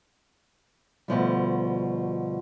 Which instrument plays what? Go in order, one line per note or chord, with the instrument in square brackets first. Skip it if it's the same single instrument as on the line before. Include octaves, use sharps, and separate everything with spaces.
[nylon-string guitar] D2 B2 F3 G3